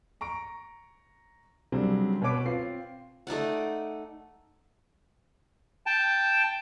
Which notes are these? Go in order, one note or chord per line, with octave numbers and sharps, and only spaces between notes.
A#5 C#6 D7
C#3 F#3 G3 C4 D4
B2 B4 C#5 D6 D7
C4 F4 C7
A3 D#4 D5 F#5
G5 A5